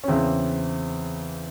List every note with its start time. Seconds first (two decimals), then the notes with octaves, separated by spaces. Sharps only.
0.04 C#4
0.08 E2 C#3 E3 C4